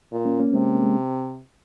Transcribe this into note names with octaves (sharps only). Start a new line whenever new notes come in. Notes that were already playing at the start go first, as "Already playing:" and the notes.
A#2
A#3 C#4
A#3 C#4
C3 G#3 C4
A#3
G#3